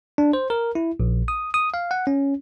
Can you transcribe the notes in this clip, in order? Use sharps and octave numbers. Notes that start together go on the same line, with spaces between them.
D4
C5
A#4
E4
A#1
D#6
D#6
F5
F#5
C#4